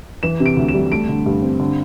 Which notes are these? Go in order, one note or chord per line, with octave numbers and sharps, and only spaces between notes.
E3 E7
C3
D7
D2
E7
G3
A3 D7
D3
G2
C4
D3